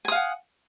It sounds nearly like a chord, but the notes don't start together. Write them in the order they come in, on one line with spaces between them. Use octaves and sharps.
G#5 D#6 F5 F#5